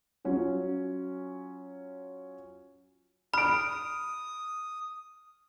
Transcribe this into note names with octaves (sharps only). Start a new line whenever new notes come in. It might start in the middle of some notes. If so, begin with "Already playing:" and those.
F#3 C#4 F4
B5 D#6 F6 D7